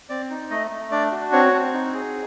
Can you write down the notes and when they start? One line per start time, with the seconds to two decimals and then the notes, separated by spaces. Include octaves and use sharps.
0.09 C4 D5
0.30 D#4
0.50 A3 D#5
0.71 A3
0.91 D4 D5
1.12 F#4
1.32 C4 C#5
1.53 C4
1.73 D#4
1.94 G#4